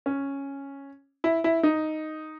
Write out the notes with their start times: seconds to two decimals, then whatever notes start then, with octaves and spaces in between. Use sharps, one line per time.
0.06 C#4
1.24 E4
1.44 E4
1.63 D#4